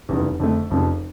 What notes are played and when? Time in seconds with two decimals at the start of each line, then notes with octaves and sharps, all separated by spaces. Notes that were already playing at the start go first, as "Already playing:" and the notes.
0.09 F1 E2 C#3 G3
0.40 F2 D3 A3
0.70 F1 F2 C#3 F3